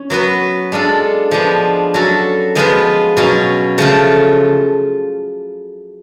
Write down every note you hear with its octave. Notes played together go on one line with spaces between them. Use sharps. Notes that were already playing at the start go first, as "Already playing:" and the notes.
Already playing: C#4
F#3 B3 F#4 B4
G#3 D4 F4 A4
F3 G#3 B3 D4
F#3 C#4 F#4 A4
F3 G#3 B3 F4 B4
B2 F#3 C#4 F4
C#3 F3 A3 F4